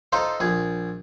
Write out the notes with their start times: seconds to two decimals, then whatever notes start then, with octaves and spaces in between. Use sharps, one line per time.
0.12 D#4 F4 A4 C5
0.40 A#1 G#4